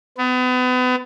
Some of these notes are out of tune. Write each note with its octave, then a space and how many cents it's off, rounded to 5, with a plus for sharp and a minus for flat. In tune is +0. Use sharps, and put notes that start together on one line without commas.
B3 +35